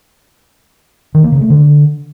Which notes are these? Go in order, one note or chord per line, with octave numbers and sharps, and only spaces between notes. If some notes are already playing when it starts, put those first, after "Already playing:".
D#3
A#3
C#3
A3
D3